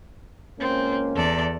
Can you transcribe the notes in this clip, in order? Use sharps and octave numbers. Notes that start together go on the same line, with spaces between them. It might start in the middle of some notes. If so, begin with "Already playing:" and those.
C#2 A#3 C4 C#4
E2 A4 D5